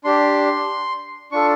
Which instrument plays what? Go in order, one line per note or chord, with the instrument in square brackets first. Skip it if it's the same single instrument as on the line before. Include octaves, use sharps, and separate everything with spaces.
[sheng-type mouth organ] D4 G4 C6
D4 F4 A4 C#6